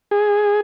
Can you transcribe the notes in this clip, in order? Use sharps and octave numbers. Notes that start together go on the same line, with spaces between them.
G#4